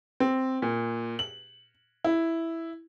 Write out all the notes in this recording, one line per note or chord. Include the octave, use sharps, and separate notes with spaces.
C4
A#2
F#7
E4